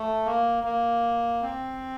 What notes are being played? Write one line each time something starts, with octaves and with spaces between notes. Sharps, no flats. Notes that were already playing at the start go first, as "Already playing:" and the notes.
Already playing: A3
A#3
A#3
C4